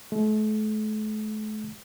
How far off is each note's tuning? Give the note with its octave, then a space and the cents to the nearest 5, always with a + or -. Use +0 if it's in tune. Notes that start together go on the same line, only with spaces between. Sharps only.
A3 -40